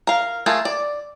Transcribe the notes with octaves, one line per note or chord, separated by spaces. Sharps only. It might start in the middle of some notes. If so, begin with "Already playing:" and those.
A#4 F5
A3 F4 G#4 A#4
D5